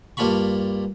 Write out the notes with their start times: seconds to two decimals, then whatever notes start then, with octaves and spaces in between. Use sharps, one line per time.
0.17 G2 A#3 D4 F4 B5 C#6